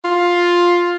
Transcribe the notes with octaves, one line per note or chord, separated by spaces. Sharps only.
F4